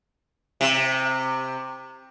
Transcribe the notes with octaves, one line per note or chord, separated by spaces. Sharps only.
C3